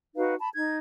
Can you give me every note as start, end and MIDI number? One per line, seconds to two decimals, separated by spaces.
0.16 0.35 63
0.16 0.35 66
0.16 0.35 71
0.16 0.35 77
0.39 0.49 81
0.39 0.49 83
0.54 0.79 63
0.54 0.79 92